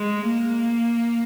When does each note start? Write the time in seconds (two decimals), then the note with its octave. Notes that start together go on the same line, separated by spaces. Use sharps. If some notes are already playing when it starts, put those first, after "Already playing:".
Already playing: G#3
0.28 A#3